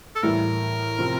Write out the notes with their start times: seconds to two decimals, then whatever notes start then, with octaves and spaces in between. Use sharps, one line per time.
0.16 A4
0.23 A2 E3 G3 A#4
0.99 C3 F3 C4